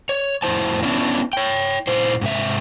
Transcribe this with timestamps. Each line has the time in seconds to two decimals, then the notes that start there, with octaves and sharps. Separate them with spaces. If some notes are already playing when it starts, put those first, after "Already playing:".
0.09 C#5
0.42 F2 A2 C4 E4 C5 A5
0.83 B3 C#4 D4 E4
1.33 C#5 G5
1.87 A#2 E4 C5
2.21 G#2 C3 E5